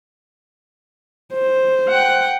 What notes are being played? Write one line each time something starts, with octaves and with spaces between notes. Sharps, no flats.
C5
F#5 G5 F#6